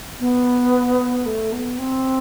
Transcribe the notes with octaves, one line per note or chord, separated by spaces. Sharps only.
B3
A3
B3
C4